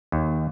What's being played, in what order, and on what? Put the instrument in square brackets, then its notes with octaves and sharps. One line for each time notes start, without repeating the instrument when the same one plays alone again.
[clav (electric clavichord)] D#2